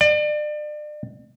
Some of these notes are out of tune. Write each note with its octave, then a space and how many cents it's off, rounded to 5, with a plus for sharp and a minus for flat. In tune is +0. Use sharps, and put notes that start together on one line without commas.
D5 +35